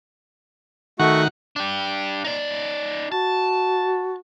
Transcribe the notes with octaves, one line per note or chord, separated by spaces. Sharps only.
D#3 A3 F#4 F#5 C#6
D4 G4
D#4 D5
F#4 A5